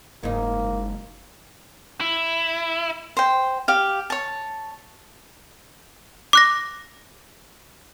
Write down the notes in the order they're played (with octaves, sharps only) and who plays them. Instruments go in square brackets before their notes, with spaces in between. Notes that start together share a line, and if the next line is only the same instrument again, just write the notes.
[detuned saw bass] F#1 [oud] G#2 D#4 [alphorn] A#3
[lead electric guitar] E4
[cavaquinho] C5 G5
G4 F5
C#5 A5
[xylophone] D6 F#6 A#6